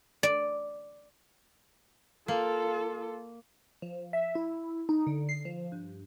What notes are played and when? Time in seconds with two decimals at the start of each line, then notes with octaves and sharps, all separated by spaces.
0.23 D5
2.28 A#3 F4 A4
3.82 F3
4.13 E5
4.35 E4
4.89 D#4
5.07 D3
5.29 C7
5.45 F3
5.72 G2